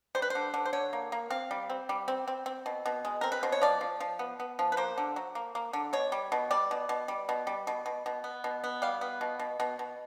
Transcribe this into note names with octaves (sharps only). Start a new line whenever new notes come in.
G3 C5
B4
D3 C5
D3
C5
D3 C#5
A#3
A#3
C4 F5
G3
C4
G3
C4
C4
C4
B2
B2
G#3
C4 A#4
B4
B2 C5
C#5
F3 D5
F3
F3
B3
B3
F3
B4
A#3 C5
D3
F#3
A#3
A#3
D3
B2 C#5
G3
B2
G3 D5
B2
B2
G3
B2
G3
B2
B2
B2
B3
B2
B3
G3 F5
B3
B2
B2
B2
B2